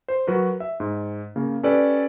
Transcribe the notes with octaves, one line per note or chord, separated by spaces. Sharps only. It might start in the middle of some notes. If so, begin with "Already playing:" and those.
C5
F#3 F#4 A#4 B4
E5
G#2
C#3 A#3
C#4 G4 A4 B4 D5